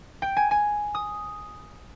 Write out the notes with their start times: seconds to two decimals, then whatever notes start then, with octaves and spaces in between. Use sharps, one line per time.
0.22 G5
0.37 G#5
0.51 G#5
0.95 D#6